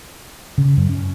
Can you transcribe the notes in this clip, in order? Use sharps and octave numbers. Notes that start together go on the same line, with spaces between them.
C#3
F#2
C#4